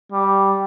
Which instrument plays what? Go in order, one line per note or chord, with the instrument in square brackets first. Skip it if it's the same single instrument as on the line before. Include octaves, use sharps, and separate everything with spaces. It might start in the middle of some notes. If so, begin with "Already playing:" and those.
[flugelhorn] G3